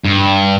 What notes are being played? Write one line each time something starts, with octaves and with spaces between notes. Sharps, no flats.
G2